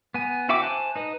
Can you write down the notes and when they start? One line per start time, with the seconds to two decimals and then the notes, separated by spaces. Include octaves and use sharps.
0.14 B3 G#5
0.49 E4 F#4 E5 G5 D6
0.62 C5 G#5 A5 F#6
0.96 D#4 B4 D#5